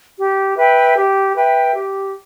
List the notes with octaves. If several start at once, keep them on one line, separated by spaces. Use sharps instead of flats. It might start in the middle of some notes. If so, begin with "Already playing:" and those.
G4
B4 E5 G5
G4
B4 E5 G5
G4